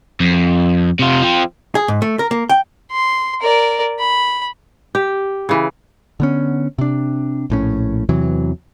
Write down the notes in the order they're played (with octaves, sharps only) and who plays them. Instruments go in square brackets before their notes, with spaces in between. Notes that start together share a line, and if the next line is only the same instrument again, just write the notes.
[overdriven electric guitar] F2
C3 F4
F3 C4
[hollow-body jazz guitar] G#4
G#2
A3
A#4
A#3
G5
[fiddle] C6
A#4 D5
B5
[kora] G4
C#3 E3
[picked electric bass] D3 B3 C#4
C3 D4
A#1 A2 C#4
E2 C3 E3 F#3